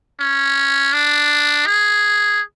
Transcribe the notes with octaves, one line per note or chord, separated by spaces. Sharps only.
C#4
D4
G#4